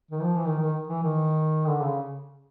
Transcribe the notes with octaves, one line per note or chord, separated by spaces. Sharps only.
D#3
F3
E3
D#3
D#3
E3
D#3
D3
C#3